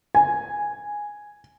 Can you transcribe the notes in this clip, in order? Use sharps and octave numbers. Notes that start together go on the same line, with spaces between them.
G#5